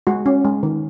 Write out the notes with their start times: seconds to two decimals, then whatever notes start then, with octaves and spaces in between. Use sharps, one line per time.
0.07 G#3 F#4
0.26 C#4
0.45 G#3
0.63 D#3